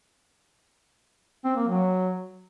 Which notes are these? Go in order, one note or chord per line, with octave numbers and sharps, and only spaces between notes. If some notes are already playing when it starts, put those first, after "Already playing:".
C4
A#3
F#3